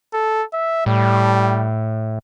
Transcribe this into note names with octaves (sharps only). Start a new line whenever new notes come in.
A4
E5
A2 G3